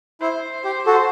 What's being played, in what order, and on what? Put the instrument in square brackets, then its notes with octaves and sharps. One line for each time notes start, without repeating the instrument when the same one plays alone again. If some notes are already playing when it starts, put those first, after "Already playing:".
[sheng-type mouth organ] E4 [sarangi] C5
[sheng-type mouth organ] G4
F#4 A4